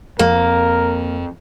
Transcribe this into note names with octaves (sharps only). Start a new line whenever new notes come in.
F2 A#3 A#4